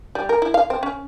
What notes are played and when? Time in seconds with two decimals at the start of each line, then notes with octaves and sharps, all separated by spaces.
0.15 G3
0.29 A#4
0.42 E4
0.54 F5
0.70 C4
0.83 C#4